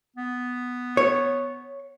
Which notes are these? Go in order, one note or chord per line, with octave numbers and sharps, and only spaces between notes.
B3
C#5